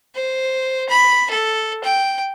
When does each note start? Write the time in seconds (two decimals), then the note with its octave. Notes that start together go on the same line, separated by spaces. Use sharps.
0.15 C5
0.89 B5
1.30 A4
1.83 G5